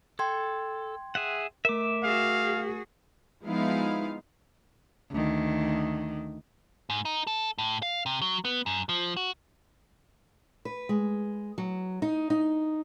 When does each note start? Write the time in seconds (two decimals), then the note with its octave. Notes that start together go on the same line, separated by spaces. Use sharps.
0.19 A4 G5 C6 G#6
1.15 G#4 E5 F#5
1.65 A3 A#4 E5 D6
2.03 F#4 G#4 F5
3.44 F3 G#3 B3 D#4 E4 F5
5.11 D2 D#3
6.90 G#2
7.05 D#4
7.27 A4
7.58 A2
7.82 F5
8.06 C3
8.22 F#3
8.45 B3
8.66 F#2
8.89 F3
9.17 F#4
10.65 B4
10.89 G#3
11.58 F#3
12.02 D#4
12.30 D#4